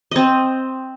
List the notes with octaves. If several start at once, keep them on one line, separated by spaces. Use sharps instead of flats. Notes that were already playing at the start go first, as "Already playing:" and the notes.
C4 D#5